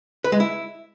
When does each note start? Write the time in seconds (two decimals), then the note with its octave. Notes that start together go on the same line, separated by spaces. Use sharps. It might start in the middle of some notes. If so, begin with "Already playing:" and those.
0.24 B4
0.32 G#3
0.40 E4